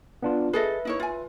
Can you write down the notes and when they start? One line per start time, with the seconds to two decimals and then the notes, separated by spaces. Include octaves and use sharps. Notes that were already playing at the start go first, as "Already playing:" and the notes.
0.23 B3 D4 F4
0.53 G#4 A4 B4 D#5 E5
0.85 D#4 E4 C#5
1.00 F4 G#5